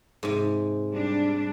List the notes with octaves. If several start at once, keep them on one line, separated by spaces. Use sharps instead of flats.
G#2 C3
G3 D4